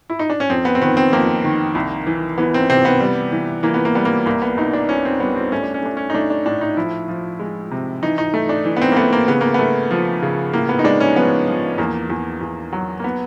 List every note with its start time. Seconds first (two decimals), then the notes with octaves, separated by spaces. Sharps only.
0.10 E4
0.19 D#4
0.30 D4
0.40 C#4
0.50 F2 C4
0.65 B3
0.75 C4
0.82 D#3 B3
0.97 C4
1.13 F2 A#3
1.44 D#3
1.75 C2
2.07 E3
2.38 E3 B3
2.54 C4
2.70 C3 C4
2.85 B3
3.00 G3
3.32 E3
3.63 E3 A#3
3.74 B3
3.85 A#3
3.95 G3 B3
4.05 A#3
4.26 C2 A#3
4.42 B3
4.57 C2 D#4
4.73 D4
4.89 C2 C#4
5.05 C4
5.20 G3 B3
5.36 C4
5.52 A3 C#4
5.63 D4
5.74 C#4
5.83 A3 D4
5.97 C#4
6.10 D#4
6.14 A3 D4
6.30 D4
6.46 A2 D4
6.61 D#4
6.77 F3 E4
7.08 F3
7.39 G#3
7.71 C3
8.03 E3 D#4
8.18 D#4
8.34 A3
8.49 D4
8.65 E3
8.76 B3
8.81 C4
8.92 A#3
8.96 A3 B3
9.13 A#3
9.28 C#3 B3
9.41 A#3
9.54 A3 B3
9.91 F3
10.22 C#3
10.53 A2 A#3
10.69 B3
10.79 D#4
10.84 G#3 D4
11.00 C#4
11.16 F3 B3
11.48 F3
11.78 E2 A#3
12.10 E2
12.41 E2
12.73 F#3
13.00 A#3
13.04 B3